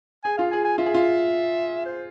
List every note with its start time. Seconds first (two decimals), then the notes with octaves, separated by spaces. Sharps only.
0.24 G#4 G#5
0.38 F4 F5
0.51 G#4 G#5
0.65 G#5
0.78 F4 E5
0.86 G#4
0.94 F4
1.86 C5